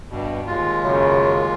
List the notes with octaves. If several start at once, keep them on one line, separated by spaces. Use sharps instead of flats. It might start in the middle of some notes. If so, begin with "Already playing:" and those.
G2 B2
D#2 G#3 F4
F#2 C#3